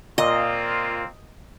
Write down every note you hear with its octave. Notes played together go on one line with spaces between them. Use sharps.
A#2 A#3 C4 F4 D#5